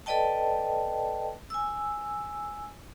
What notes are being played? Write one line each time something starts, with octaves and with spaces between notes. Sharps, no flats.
A4 B4 D5 D#5 G5 A5
G#5 E6